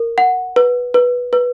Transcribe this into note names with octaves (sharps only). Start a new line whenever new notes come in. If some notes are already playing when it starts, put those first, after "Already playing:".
Already playing: A#4
F#5
B4
B4
B4